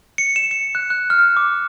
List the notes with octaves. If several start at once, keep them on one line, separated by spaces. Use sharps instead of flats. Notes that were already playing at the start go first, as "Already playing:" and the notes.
C#7
E7
C#7
F#6
F#6
F6
D6